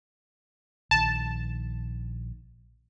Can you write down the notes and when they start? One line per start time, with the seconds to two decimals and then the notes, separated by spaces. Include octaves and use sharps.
0.91 A#1 D#3 A5